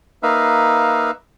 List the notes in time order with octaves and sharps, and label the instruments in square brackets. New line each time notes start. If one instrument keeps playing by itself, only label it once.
[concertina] A#3 D#4 B4 E5 F5